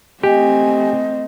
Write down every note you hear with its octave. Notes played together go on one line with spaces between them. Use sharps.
A3 C4 G4 D#5 G#5